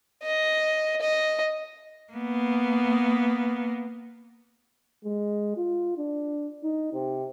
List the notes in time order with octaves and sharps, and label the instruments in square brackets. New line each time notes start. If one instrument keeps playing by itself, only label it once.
[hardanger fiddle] D#5
D#5
[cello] A#3 B3
[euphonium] G#3
F4
D4
D#4
C3